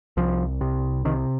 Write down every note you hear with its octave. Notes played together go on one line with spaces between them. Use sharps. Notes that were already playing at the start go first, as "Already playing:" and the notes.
C2 F3
C3
C3 D#3